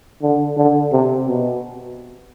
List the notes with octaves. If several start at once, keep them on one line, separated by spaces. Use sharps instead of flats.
D3
D3
C3
B2